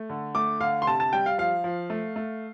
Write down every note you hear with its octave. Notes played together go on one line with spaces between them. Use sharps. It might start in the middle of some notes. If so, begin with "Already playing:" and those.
Already playing: A3
D3
A3 D6
D3 F5
C6
C3 A5
A5
G3 G5
F5
F3 F5
F3
A3
A3